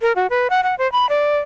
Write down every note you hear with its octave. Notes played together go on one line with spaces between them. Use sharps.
A#4
F#4
B4
F#5
F#5
C5
B5
D5